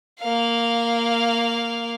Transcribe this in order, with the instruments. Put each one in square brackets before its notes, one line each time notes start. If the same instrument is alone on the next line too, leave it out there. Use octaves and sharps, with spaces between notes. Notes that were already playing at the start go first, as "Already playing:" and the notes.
[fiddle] A#3 F5